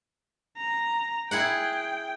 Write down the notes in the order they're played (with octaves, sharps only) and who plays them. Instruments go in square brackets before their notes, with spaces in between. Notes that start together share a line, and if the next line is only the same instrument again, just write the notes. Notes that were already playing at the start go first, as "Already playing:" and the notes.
[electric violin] A#5
[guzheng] E4 G#4 F#5 [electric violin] G5